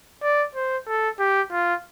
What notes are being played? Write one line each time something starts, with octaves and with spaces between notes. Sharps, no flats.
D5
C5
A4
G4
F4